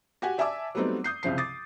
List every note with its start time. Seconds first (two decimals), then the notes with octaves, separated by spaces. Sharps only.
0.22 F#4 G4 F#5 G#5
0.38 D5 E5 G#5 A5 D6 E6
0.75 F#3 G3 A3 B3 C4 D#4
1.04 D#6 G6 C7
1.23 C2 C#3 F3 C7
1.38 D6 D#6 A6